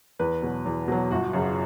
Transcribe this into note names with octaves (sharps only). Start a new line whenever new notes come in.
E2 B4
B2 F#3
E2
B2 F#3
G1 F#4
F#2 C#3